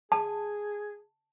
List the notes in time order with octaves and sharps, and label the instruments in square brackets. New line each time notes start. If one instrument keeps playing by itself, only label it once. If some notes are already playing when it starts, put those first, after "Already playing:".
[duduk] G#4 [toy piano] A5